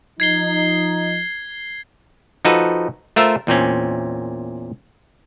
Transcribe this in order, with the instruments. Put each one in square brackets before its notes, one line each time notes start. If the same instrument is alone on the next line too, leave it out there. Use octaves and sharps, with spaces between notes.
[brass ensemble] F3 D#4 [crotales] G#6 C7 G7
[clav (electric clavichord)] F3 D#4 F#4 A4 B4
A3 F4 A#4 C5 E5
E2 A#2 C4 C#4